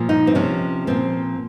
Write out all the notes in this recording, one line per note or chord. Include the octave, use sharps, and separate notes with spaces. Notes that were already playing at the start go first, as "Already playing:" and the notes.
Already playing: A#2 F3
D#4
C4
C3 F3 C#4
A#2 F3 C4